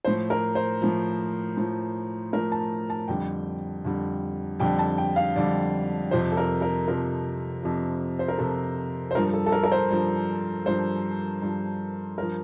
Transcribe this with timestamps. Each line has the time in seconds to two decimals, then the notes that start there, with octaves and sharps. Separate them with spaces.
0.05 A2 F3 C5
0.30 A#4
0.55 C5
0.82 A2 F3
1.57 A2 F3
2.33 A2 F3 A#4
2.52 A5
2.90 A5
3.08 F2 D3 G3 G5
3.85 F2 D3 G3
4.60 F2 D3 G3 G5
4.79 A5
4.98 G5
5.16 F5
5.36 F2 D3 G3 D5
6.11 F2 C3 F3 C5
6.32 A4
6.37 A#4
6.62 A#4
6.87 F2 C3 F3 A#4
7.62 F2 C3 F3
8.19 C5
8.28 A#4
8.38 F2 C3 F3 A4
9.11 C5
9.15 G2 F3 A#4
9.33 A4
9.46 A4
9.52 A#4
9.63 A#4
9.72 C5
9.91 G2 F3
10.66 G2 F3 C5
11.42 G2 F3
12.18 G2 F3 A#4